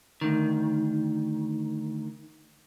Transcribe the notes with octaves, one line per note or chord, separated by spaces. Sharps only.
D2 D#3